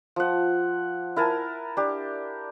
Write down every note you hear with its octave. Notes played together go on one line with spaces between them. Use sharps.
F3 F#5
E4 A#4 G#5 A5
D4 G4